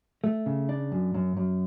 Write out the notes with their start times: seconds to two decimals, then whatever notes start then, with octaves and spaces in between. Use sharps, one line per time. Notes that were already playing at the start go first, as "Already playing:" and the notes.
0.24 A3
0.46 C#3
0.69 D4
0.92 F#2
1.14 F#2
1.37 F#2